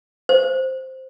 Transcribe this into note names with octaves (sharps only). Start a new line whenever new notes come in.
C5